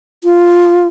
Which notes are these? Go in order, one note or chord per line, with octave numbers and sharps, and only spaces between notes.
F4